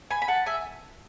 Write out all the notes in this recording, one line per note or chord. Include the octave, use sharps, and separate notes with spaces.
G#5 B5
B5
F#5 A5
E5 G#5